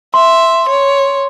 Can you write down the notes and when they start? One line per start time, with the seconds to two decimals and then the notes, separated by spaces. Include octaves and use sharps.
0.14 E5 C6
0.69 C#5